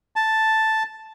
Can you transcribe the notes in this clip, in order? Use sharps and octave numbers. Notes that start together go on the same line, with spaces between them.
A5